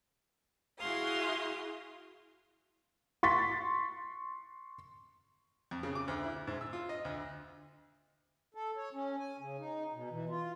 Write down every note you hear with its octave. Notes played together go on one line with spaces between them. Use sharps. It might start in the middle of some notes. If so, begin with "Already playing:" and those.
E4 F#4 G#4 F5 C6 D#6
C6 C#6 A6 B6
F2
C#3
D6
D2
E4
G#2
E6
F4
D#5
D2
A4
C#5
C#4
G#5
C#3
D#4
B2
E3
F4